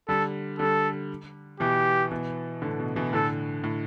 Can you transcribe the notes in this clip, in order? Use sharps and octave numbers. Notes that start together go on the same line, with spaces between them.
D3 G3 A4
D3 G3 A4
B2 E3 G4
B2 E3
A2 D3
B2
B2 E3
A2 D3 A4
A2